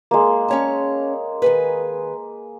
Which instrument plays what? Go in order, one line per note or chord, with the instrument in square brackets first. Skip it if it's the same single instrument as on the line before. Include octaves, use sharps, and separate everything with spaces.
[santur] G#3 A#3
[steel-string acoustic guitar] C#4 C#5 A5
D#3 G#4 B4